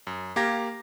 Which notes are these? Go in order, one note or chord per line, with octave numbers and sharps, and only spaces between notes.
F#2
A#3 G4 F5 A#5 G#6 A#6